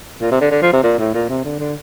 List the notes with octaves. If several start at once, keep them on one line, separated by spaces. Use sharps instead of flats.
A#2
C3
D3
D3
F3
C3
A#2
A2
A#2
C3
D3
D3